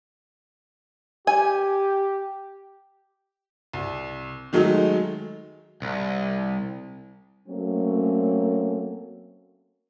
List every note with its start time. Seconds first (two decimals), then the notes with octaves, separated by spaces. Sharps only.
1.27 G4 G#5
3.74 C2
4.53 D#3 F#3 G#3 A3
5.82 C2
7.48 F#3 A3 A#3 C4 C#4